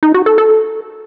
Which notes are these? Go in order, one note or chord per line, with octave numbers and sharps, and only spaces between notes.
D#4
F#4
A4
A4